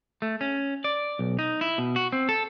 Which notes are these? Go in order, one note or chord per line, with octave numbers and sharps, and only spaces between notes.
A3
C#4
D5
B1
D#4
E4
B2
F#4
C4
A4